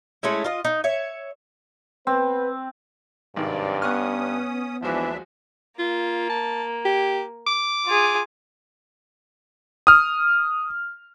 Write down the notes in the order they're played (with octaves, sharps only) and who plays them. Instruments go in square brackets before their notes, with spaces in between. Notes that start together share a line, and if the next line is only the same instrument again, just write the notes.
[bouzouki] G#3 A3 C#4 E4
F4 D#5
D#4
C#5 E5
[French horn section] B3 B4 [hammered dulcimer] C4
[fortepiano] G#1 D#3 [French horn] G2 [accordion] C3 F#3 D5
[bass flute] B3 [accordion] C#4 D#6 [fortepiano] F#5 C#6 F6
[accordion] D#2 D4 E5 [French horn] E3 [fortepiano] F3 G#3 F#4
[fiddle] A#3 [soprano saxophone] F4
[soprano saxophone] A5
G4
D6
[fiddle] F4 G#4
[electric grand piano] D#6 F6